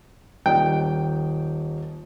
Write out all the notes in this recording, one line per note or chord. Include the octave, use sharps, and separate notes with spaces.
D#1 D#3 D#5 G5